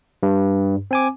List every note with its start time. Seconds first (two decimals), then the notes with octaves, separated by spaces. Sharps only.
0.23 G2
0.91 C4 G#5 D6